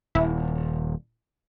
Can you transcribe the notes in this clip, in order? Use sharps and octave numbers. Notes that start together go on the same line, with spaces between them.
D#1 E4